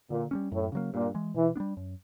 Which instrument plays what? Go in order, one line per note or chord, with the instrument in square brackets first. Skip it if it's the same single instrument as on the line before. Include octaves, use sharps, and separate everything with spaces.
[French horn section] A#2 [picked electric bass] D3
[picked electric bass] G3 A#3 C#4
[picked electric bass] F#2 [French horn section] A2
[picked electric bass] C#3 F#3 A#3
[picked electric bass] G2 [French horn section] A#2
[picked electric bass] E3 G#3
[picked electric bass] B2 [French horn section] E3
[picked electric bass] B3 D4
G3
F#2